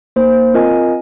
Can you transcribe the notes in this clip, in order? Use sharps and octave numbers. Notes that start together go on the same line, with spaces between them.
A#3 D#4 C5
C4 F4 A#4 D#5 G#5